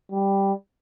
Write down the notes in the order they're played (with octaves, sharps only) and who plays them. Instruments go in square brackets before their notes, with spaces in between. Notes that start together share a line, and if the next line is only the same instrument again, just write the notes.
[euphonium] G3